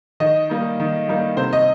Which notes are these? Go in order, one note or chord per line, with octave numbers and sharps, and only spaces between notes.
D#3 D#5
G3 A#3 D#4
D#3
G3 A#3 D#4
C3 C5
D#5